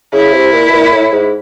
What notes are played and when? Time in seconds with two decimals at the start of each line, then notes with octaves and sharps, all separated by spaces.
0.12 C#3 E4
0.33 C3
0.52 A#2
0.68 B2
0.72 A#2
0.92 A2
1.12 G#2